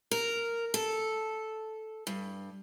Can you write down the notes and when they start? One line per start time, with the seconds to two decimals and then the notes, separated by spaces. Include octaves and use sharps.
0.11 A#4
0.74 A4
2.07 G2